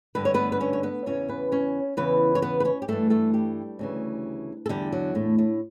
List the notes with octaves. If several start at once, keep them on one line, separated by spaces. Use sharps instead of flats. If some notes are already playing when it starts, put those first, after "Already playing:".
G2 D3 B4
C#5
B3 B4
B4
C#4 C#5
C#5
B3 B4
E2 C#3 E3 C#4 C#5
B3 B4
C#4 C#5
E2 C#3 E3 B3 B4
C#5
B3 B4
B4
C#4 C#5
G4
G2 E3 A3 A4
A3 A4
G3 G4
D2 C#3 E3
A4
E2 D3 G3 G4
F#3 F#4
A2 A3
A2 A3